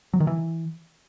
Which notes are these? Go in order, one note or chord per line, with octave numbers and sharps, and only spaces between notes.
F#3
D#3
E3